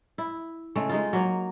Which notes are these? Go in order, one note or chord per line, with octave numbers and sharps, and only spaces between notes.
E4
C#3 G#3 A3
G#3 D#4 F4
F#3 A#3